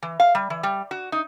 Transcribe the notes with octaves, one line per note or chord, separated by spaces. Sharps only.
E3
F5
G3
E3
G3
F#4
D#4